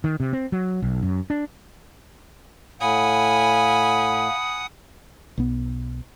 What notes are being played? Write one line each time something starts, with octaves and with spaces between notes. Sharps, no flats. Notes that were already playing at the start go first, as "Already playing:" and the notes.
D#3
C3
C4
F#3
B1
F#2
D4
A2 F5 F#5 G#5 B5 D#6
B1 B3